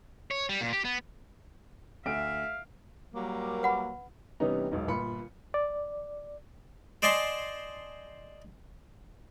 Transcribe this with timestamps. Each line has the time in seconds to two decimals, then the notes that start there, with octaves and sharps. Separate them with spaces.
0.31 C#5
0.49 G3
0.61 A#2
0.73 G4
0.85 B3
2.06 D2 E5 F5 D7
3.14 F#3 G3 A#3
3.63 B4 F#5 B5
4.40 C3 E3 G3 B3 C#4 D#4
4.71 E1 B1 D#4
4.88 G1 A#2 B5 C#7
5.54 D5
7.02 C5 D5 D#5 G#5 A5 C6